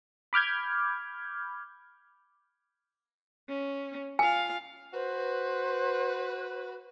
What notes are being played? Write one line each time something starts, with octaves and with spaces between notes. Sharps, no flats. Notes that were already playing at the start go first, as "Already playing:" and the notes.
B5 D6 F6 G6 G#6
C#4
F4 F5 G#5
F#4 B4 C5